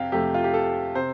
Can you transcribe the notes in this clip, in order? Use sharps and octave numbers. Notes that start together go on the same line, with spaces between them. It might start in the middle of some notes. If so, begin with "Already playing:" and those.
Already playing: F2 C3 F5 G5
F2 C3 A3 G4
F4
G4
A4
C3 C5